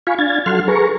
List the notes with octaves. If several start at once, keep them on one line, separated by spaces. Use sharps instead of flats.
F4 F5 G#5 B5 C#6
D4 F5 G#6 A6
F#3 A4 F#5 C6 F6
G#4 A4 B4 A#5 C#6